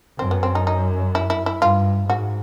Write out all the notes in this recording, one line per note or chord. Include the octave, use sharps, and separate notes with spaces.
F#2 C4
B3
C4
D#4
D#4
E4
E4
E4
G2 F4
G#2 F#4